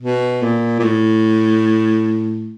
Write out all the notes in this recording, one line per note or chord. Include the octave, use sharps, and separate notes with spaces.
B2
A#2
A#2
A2